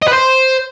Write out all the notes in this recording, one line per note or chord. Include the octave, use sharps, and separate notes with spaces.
D#5
B4
C5